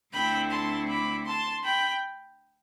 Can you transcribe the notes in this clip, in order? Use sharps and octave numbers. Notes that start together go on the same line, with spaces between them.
D2 D3 A3 C4 E4 G5 B5
A5 C6
B5 D6
A5 C6
G5 B5